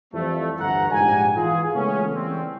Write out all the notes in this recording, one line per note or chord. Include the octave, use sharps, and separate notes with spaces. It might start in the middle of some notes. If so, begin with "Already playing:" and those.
F2 E3 F3 G3 A3
G1 D2 F#5 A#5
A#1 G#2 G4 F#5 G#5
E3 F4 G#4
C#3 G#3 A3 B3 C#4
E3 G3 C4